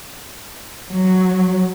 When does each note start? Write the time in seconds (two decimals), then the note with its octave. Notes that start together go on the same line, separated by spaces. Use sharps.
0.91 F#3